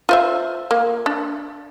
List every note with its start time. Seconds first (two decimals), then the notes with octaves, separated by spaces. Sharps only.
0.09 F4 C5 E5
0.71 A#3
1.06 D4